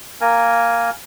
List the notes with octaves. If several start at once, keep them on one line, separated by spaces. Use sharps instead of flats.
A#3 A#4 G#5